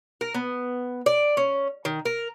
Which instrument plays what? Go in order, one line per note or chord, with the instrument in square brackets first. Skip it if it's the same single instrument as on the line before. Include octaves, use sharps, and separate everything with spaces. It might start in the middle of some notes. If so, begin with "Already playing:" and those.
[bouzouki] A#4
B3
D5
C#4
D#3
A#4